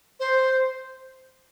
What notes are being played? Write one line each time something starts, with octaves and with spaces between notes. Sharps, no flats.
C5